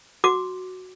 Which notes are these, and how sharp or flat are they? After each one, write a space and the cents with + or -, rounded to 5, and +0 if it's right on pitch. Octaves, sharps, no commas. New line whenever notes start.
F#4 +0 D6 +0